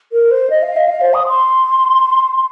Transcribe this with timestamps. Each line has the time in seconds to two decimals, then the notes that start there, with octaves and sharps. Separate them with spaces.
0.13 A#4
0.31 C5
0.50 D#5
0.63 F5
0.76 D#5
0.89 F5
1.01 C5
1.14 D#6
1.27 C6